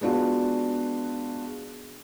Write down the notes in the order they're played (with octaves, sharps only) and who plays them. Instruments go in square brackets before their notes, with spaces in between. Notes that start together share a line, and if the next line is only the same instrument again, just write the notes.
[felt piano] G#3 B3 D4 F4 F#4